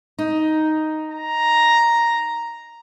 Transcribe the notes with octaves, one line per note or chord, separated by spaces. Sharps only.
D#4
A#5